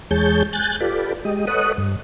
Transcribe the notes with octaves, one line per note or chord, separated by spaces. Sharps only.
E2 G#3 G#4 C#5 A5 G6
G#5 F#6 G6 A6
F4 G4 A4 B4 D5
G#3 G4 D#5
A4 B4 C#5 D#5 F#5 D#6
G2